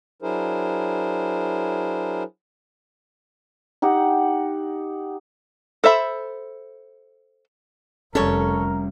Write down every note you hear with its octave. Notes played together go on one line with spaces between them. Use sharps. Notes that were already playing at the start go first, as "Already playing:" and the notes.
F#3 D4 E4 G#4 A#4 C5
D#4 G4 F#5
A4 C5 E5 B5
F1 G3 C#4 A4 A#4 C#5